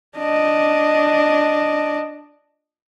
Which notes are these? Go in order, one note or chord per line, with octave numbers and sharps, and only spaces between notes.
D4 D#5